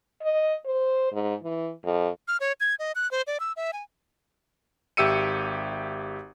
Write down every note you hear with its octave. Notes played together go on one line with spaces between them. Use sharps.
D#5
C5
G#2
E3
F2
F6
C#5
G#6
D#5
F#6
C5
D5
E6
E5
G#5
G#1 G4 E5 E6 C#7 D#7